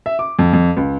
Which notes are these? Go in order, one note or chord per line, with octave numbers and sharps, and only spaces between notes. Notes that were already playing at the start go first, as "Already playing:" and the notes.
E5
D6
F2
F2
C#2